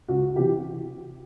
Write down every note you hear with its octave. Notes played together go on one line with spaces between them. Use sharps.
C#2 F#4
C3 E3 G4